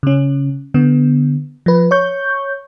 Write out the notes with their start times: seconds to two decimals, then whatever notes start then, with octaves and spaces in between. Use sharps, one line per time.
0.03 C#3 C#4
0.74 D3 B3
1.66 F3 B4
1.91 C#5 C#6 G6